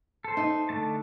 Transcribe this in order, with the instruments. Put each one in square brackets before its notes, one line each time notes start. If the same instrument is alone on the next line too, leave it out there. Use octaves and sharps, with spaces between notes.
[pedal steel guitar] A4 C5
[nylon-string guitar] D#4
[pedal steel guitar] D3 A3 A5